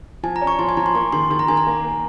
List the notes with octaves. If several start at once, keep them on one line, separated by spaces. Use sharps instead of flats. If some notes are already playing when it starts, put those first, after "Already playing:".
F3 G#5
A#5
C#4
C#6
F3 C6
G#5
F3 A#5
C6
A#3 C#6
D#3 C6
D#3 C6
A#5
D#3 G#5
A#5
A#3
A#3